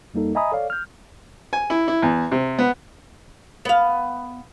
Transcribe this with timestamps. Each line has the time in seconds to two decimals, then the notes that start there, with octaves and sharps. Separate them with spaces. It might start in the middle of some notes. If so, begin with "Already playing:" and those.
0.14 F2 G3 A#3 D#4 A4
0.35 D#5 E5 G#5 A#5 B5 D#6
0.52 A4 C#5 D5 F5
0.70 F6 G6
1.53 G#5
1.70 E4
1.88 E4
2.02 E2
2.32 C3
2.59 B3
3.65 B3 F5